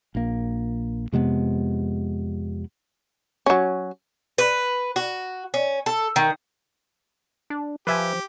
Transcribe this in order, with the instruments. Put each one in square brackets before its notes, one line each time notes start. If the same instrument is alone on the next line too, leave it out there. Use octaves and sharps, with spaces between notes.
[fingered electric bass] A#1 A#3
F2 C3 G#3 B3
[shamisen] F#3 C#4
[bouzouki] B4
F#4
C#4
A4
D#3
[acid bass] D4
[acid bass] F3 [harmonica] G4 [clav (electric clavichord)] B4 E5 G#5